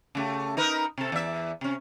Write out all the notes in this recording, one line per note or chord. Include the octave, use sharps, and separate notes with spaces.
C#3 A3 G4
D#4 A#4 B4
C3 A4
E2 D5 E5
C3 C#4